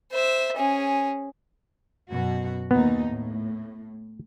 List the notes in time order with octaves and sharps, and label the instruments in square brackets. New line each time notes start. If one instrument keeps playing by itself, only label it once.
[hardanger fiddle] C5 E5
C#4 G#4
[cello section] F#2 B2 F#4
[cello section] D#2 A#2 D#4 [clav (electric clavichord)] B3
[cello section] A2